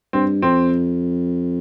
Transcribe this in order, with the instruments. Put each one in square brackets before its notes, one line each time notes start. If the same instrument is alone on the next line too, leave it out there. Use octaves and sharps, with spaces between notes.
[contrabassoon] G2 [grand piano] C4
[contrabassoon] F2 [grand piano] C4